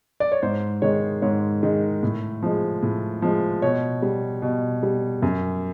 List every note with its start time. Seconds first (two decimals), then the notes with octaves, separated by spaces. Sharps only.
0.20 D5
0.32 C#5
0.42 G#2 C5
0.82 D#3 G#3 C#5
1.22 G#2 C#5
1.63 D#3 G#3
2.03 A2
2.42 F3 G#3
2.83 A2
3.22 F3 G#3
3.62 B2 C#5
4.02 G3
4.42 B2
4.83 G3
5.22 F#2